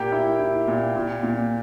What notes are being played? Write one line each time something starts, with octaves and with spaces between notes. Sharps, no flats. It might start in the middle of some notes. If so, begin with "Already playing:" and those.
Already playing: A#2 A#3 G4 G5
E4
E4
A#2
A#2
A#2